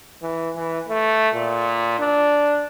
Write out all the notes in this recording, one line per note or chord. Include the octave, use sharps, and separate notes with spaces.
E3
E3
A3
A#2
D4